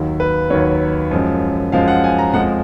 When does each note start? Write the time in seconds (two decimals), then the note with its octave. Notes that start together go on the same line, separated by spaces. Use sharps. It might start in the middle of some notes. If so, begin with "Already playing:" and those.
Already playing: D#2 D#3 F#3
0.20 B4
0.50 D#2 D#3 F#3 C#5
1.11 F#2 F3 G#3
1.72 F#2 F3 G#3 F5
1.88 F#5
2.04 G#5
2.18 A#5
2.34 F2 F3 G#3 F#5